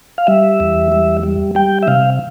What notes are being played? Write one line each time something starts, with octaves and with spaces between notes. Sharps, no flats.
F5
G3 E5
E2
G3
G3
G3 G5
E5
C3 F5